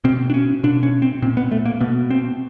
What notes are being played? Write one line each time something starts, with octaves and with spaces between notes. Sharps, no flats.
B2 C4
D4
C#4
B2 D4
C#4
C4
A#2 C4
B3
A3
A#3
B2 B3
C4